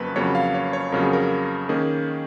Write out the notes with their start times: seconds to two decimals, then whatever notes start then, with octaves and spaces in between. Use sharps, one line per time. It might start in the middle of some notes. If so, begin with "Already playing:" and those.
Already playing: F2 C#3 F#3 A#3 B4
0.15 F2 C#3 F#3 A#3 C#5
0.35 F5
0.54 C#5
0.73 C#5
0.92 F2 C#3 F#3 A#3 A#4
1.03 G#4
1.13 A#4
1.69 D#3 A#3 C#4 G#4